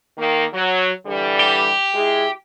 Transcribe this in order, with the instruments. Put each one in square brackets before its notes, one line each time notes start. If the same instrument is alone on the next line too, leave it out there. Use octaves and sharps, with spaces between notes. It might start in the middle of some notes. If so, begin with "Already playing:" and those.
[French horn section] D#3 A#3
F#3
D3 E3 G3
[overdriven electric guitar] G4
[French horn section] G#3 E4 G#4